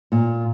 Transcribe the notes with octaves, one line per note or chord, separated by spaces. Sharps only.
A#2